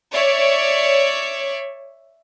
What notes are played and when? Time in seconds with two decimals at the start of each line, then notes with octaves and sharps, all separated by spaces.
0.13 C#5 D5 E5